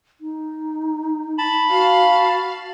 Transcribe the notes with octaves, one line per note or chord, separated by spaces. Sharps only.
D#4
A5 B5
F#4 F5